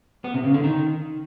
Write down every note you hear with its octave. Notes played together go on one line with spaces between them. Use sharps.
B3
C3
C#3
D3
D#3